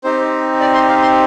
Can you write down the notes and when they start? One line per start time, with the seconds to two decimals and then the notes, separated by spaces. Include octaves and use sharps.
0.04 C4 D#4 G4 C5
0.61 D5
0.74 C6
0.89 F5
1.02 C6